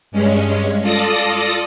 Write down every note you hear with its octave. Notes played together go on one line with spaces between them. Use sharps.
G2 G#3 C#4
F4 A4 D5 D#6 A#6